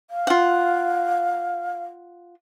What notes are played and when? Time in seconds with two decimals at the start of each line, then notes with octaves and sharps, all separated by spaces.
0.11 F5
0.27 F4 F#5